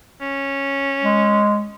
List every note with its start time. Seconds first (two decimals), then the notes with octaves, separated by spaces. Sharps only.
0.21 C#4
1.03 G#3